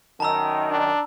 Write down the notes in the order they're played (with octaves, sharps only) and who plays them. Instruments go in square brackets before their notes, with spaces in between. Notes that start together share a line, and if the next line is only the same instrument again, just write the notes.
[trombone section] F#2 D#3 [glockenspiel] A5 A#5 E6
[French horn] D4